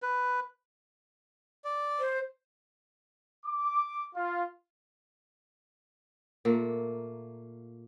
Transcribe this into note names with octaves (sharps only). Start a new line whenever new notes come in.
B4
D5
C5
D6
F4
A#2 A3 A#3